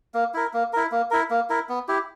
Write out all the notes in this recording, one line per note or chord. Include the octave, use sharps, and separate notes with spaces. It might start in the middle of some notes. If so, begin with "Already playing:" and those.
A#3
E4 A#4
A#3
E4 A#4
A#3
E4 A#4
A#3
E4 A#4
B3
E4 G4